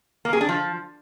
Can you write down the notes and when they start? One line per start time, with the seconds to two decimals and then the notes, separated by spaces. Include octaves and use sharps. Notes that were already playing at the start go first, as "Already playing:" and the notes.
0.25 A#3
0.33 G#4
0.41 D4
0.49 F3